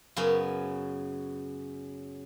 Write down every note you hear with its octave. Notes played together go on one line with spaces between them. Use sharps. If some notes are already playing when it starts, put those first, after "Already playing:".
F#2 C#3 B3 C#4